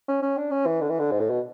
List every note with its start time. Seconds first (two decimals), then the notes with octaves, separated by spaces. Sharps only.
0.08 C#4
0.22 C#4
0.38 D4
0.51 C#4
0.66 E3
0.81 D3
0.90 E3
0.99 D3
1.11 G#2
1.20 A2
1.30 B2